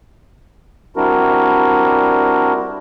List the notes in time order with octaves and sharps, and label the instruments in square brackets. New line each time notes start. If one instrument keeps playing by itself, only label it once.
[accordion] G3 C4 D4 E4 F#4 A#4